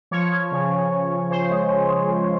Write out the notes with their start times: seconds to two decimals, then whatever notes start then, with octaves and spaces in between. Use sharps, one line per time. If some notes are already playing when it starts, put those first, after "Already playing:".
0.11 F3 C#5
0.31 F3
0.52 C#3
0.72 C#3
0.91 C#3
1.11 C#3
1.30 C#3 C5
1.50 G#3
1.70 G#3
1.90 G#3
2.10 C#3